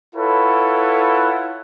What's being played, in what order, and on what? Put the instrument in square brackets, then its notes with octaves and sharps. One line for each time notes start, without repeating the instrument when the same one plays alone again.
[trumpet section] E4 F4 A4 B4 C#5 F#5